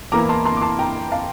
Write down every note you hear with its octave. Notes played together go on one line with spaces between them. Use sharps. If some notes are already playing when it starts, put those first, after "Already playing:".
E2 E3 A#3 E4 A#4 A#5 D6
A5 C6
A5 C6
D6
A5 C6
G5 A#5
F5 A5